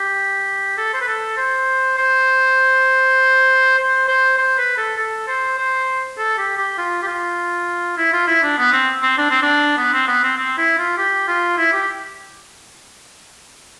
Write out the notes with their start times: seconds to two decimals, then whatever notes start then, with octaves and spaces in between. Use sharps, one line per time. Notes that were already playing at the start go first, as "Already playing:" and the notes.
Already playing: G4
0.77 A4
0.93 C5
1.00 B4
1.07 A4
1.37 C5
1.97 C5
3.78 C5
4.08 C5
4.38 C5
4.58 B4
4.77 A4
4.97 A4
5.28 C5
5.58 C5
6.18 A4
6.38 G4
6.57 G4
6.78 F4
7.03 G4
7.07 F4
7.97 E4
8.13 F4
8.27 E4
8.43 D4
8.58 B3
8.72 C4
9.02 C4
9.17 D4
9.30 C4
9.42 D4
9.77 B3
9.93 C4
10.08 B3
10.23 C4
10.37 C4
10.57 E4
10.78 F4
10.97 G4
11.28 F4
11.58 E4
11.72 G4